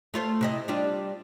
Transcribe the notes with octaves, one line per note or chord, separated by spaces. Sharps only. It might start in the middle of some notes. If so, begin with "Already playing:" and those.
A3 F4 C5
C3 E4 D#5
G3 D4 F4